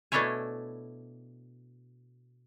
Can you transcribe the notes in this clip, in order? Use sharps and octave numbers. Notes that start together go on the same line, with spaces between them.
B2 A3 D4 E4 C#5 G#5